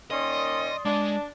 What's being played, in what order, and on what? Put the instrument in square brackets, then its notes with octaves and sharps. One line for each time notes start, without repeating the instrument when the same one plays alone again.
[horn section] D#3 A#3 C#4 [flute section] D5 C6 D#6 [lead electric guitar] D#5
[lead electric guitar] G#3 [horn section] D4